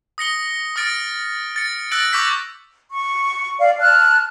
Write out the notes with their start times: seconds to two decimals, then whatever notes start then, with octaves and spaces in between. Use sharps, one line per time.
0.18 D#6 A#6 C#7 G7
0.76 D#6 F6 A6 D7
1.56 A6 C#7
1.91 E6 F#6 A6 A#6 D7 F#7
2.13 C#6 D6 E6 G6 B6
2.92 C#6
3.60 D5 F5
3.80 A5 F6 F#6